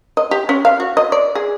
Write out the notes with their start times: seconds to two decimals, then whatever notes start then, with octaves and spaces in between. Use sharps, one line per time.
0.17 D#5
0.31 G4
0.49 C#4
0.65 F5
0.80 F#4
0.97 D#5
1.12 D5
1.35 G#4